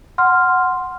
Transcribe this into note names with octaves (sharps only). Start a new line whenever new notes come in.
F#5 C6 F6